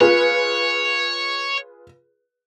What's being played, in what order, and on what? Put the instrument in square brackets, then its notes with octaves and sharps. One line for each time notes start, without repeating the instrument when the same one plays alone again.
[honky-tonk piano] F4 G#4 B4 [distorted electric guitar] C#5